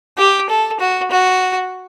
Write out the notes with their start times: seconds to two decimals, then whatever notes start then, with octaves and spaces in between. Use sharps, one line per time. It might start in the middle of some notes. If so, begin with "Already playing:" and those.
0.18 G4
0.49 A4
0.80 F#4
1.11 F#4